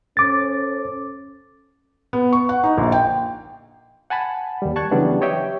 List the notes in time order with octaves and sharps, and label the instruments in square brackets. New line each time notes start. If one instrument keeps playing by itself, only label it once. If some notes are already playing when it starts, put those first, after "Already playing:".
[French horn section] C#4 A4 C5 [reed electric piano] D6 A6
[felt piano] B3
C#6
F#5
D#4
A#1
G5
[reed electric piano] F#5 G#5 A5 B5
D#2 G3
A5 C#6 F#6 G#6
C#3 E3 F#3 G3 B3 D4
G4 C#5 D#5 E5 G5